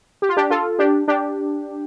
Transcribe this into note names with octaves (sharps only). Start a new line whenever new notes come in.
G4
F4
D4 G4
F4 A4
D4 G4
D4 G4